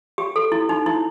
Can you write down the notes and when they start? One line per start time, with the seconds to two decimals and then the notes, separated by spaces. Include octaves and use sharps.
0.18 G4
0.36 A4
0.52 E4
0.69 D#4
0.86 E4